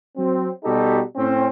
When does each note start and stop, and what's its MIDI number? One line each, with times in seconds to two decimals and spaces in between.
0.17 0.50 54
0.17 0.50 60
0.64 1.01 47
0.64 1.01 55
0.64 1.01 63
0.64 1.01 66
0.64 1.01 67
0.64 1.01 69
1.16 1.48 45
1.16 1.48 60
1.16 1.48 61